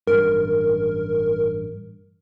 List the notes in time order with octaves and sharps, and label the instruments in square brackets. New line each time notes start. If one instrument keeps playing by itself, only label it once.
[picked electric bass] A1 G2 [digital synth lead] A#4